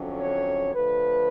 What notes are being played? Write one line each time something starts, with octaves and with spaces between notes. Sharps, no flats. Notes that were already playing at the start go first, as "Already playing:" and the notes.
Already playing: F2 D3 F#3 C#4
C#5
D3 F3 A3 B4